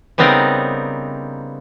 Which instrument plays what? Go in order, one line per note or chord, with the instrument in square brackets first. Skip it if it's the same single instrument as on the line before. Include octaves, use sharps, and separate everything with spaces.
[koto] C#3 G3 B3 C4 D#4 A#4